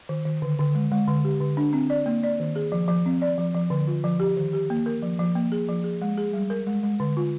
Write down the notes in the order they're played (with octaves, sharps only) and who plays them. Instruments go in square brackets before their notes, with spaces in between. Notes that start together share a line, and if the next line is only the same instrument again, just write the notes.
[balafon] D#3
D#3
D3
D3
G#3
G#3
D3
G4
D3
D4
C4
D5
A#3
D5
D#3
G#4
F3
F3
C4
D5
F3
F3
D3
F4
F3
G4
D#3
G4
A#3
A#4
F3
F3
A#3
G#4
F3
G#4
G#3
G#4
G3
A#4
G#3
G#3
D3
F4